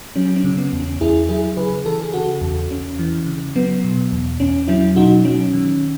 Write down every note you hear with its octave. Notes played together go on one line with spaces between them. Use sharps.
F#3 C#4
C#4
C#3
B3
E2
C#4
E2 E4 G#4
F#3 E4 G#4
C#3 G#4 B4
E3 A4
G#4
C#3 F#4 A4
E2
E2 C#4
E3
C#3
F#3 B3
B2
E2
E2 C#4
F#3 C#4 E4
B2 D#4 F#4
F#3 C#4
D#3